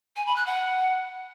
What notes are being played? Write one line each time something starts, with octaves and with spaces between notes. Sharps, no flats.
G#5
B5
F#6
F#5